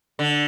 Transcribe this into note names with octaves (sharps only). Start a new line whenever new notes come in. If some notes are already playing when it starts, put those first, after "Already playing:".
D3